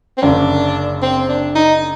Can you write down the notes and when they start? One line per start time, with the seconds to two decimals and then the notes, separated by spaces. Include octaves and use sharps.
0.18 C4
0.22 F#1 F#2 D3 D4
1.02 C4
1.29 D4
1.55 D#4